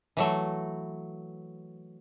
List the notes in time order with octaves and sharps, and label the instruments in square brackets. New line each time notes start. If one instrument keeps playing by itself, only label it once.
[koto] E3 F#3 A3